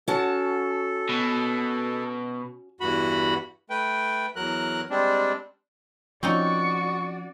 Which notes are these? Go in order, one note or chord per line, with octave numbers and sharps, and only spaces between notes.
C#4 F#4 A4 A5
B2
E2 G2 F#4 B5
A3 B4 G5
E2 F#3 A#4 F#6
G3 G#3 C4 D4
F3 C4 C#4 D#4 F#4 D5 C#6